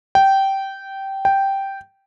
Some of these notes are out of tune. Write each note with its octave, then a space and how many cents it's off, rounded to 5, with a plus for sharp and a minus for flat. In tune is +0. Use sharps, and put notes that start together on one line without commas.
G5 -15
G5 -5